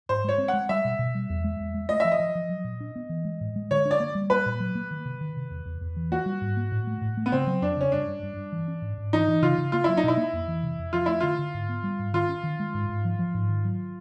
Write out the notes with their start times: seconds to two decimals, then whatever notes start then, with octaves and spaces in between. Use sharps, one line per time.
0.09 G#2 C5
0.24 G#3 C#5
0.38 C4
0.48 G#3 F#5
0.69 G3 E5
0.85 B2
0.99 B2
1.15 G3
1.30 E2
1.44 G#3
1.59 E2
1.74 G#3
1.89 A3 D#5
2.00 F3 E5
2.12 D#5
2.20 F3
2.35 F3
2.49 F#3
2.64 A#2
2.80 D4
2.96 B3
3.09 E3
3.25 G#3
3.41 A2
3.56 G#3
3.71 D3 C#5
3.85 D4
3.91 D5
4.00 A#3
4.15 G3
4.30 A#3 B4
4.46 A#2
4.60 F#3
4.75 A#3
4.91 D#3
5.05 C3
5.21 D#3
5.37 C3
5.50 E2
5.65 E2
5.81 E2
5.96 E3
6.11 A#3 F#4
6.26 G3
6.41 G#2
6.57 A#3
6.72 A2
6.87 A3
7.01 A2
7.17 A3
7.26 B3
7.32 C#3 C4
7.47 F#3
7.62 F2 D4
7.77 C#3 C#4
7.92 G2 D4
8.08 G2
8.23 G2
8.37 G2
8.52 E3
8.68 C#4
8.82 G#2
8.98 G#2
9.13 E3 D#4
9.28 E3
9.42 C#3 F4
9.58 C#3
9.72 A#3 F4
9.84 F#3 E4
9.97 D#4
10.03 B2 E4
10.17 A#3
10.33 F2
10.48 E3
10.63 C3
10.79 F2
10.93 F3 F4
11.06 A3 E4
11.21 D3 F4
11.39 D3
11.54 G#2
11.69 B3
11.84 G3
11.99 G#2
12.13 D#3 F4
12.29 C#4
12.43 D#3
12.60 G#3
12.74 G#2
12.89 G#2
13.05 F3
13.19 F3
13.34 G#2
13.49 D#3
13.64 F#3